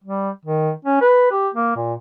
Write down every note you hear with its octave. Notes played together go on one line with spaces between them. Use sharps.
G3
D#3
C#4
B4
G4
A#3
A#2